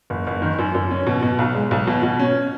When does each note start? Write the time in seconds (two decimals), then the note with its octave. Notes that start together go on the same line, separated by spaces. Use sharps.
0.10 F#1
0.27 F#1
0.42 D#3
0.59 F#2
0.75 F#2
0.91 C#4
1.07 B2
1.23 B2
1.39 B1
1.54 G#3
1.71 B1
1.87 B2
2.03 B2
2.20 C#4